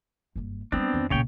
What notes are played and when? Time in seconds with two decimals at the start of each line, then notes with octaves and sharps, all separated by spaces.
0.36 F#1 G2
0.72 F3 G3 B3 C4 D4
0.94 F2 D#3
1.10 B1 A#2 C#3 C#5 G5